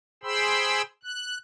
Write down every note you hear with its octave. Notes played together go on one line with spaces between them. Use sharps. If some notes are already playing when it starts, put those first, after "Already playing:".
G#4 C5 G5 B5 C6 E6
F#6